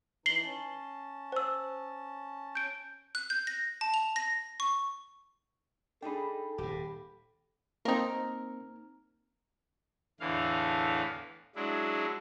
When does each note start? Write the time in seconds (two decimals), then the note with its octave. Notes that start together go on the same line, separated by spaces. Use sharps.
0.26 E3 D#4 C7 F#7 G7
0.44 C#4 A5
1.32 C5 E6
2.55 G6 D7
3.15 F#6
3.30 G6
3.47 A#6
3.81 A5
3.94 F7
4.16 A#6
4.60 C#6
6.02 D4 D#4 G#4 A4 G5 B5
6.58 D#1 G#2 G4
7.85 A#3 C4 D#4 A#4
10.20 E2 A2 D3 E3 F5
11.56 F#3 G#3 D4 E4